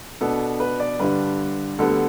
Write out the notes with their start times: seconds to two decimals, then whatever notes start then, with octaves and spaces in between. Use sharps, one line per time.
0.21 B2 B3 D4 A4
0.60 B4
0.80 D5
1.00 G2 D3 G3 D4 B4
1.78 D2 D3 G3 B3 A4